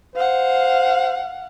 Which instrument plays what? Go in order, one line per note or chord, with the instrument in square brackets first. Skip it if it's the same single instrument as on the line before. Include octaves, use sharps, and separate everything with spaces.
[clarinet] C5 [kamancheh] F5 F#5